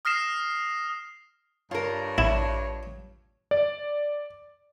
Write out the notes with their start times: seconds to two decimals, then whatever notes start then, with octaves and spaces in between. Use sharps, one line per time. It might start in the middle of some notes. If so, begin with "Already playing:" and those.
0.05 D#6 F6 A#6 C7 E7
1.71 G2 F4 A#4 C#5
2.18 A1 E4
3.51 D5